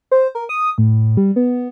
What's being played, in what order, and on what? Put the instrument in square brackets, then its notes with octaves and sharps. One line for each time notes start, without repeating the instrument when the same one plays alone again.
[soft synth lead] C5
A#4
D#6
A2
G3
B3